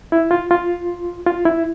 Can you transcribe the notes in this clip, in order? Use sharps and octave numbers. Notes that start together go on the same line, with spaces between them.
E4
F4
F4
F4
E4